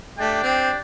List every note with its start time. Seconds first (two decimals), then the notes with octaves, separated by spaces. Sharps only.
0.18 A3 D4 G4 D5 G5
0.43 C4